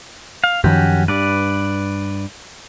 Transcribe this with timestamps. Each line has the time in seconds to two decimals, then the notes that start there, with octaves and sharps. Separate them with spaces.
0.44 F5
0.64 F#2 D#3 F3 C#4 F#4 G4
1.08 G2 B4 D5